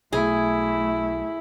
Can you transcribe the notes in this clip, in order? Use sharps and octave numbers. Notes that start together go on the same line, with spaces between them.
B1 B2 A3 E4 G#4